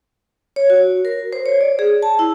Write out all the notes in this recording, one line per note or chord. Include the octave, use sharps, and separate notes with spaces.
C#5
F#4
A#4
C5
C#5
D5
G#4
A5
E4